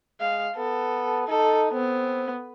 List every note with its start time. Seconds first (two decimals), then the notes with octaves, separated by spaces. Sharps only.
0.20 G#3 F5
0.56 B3 A4
1.28 D#4 A4
1.73 B3 C4